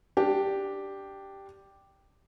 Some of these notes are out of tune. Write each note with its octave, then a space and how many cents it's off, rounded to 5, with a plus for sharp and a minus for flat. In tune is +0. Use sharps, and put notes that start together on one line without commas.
D4 +0 G4 +0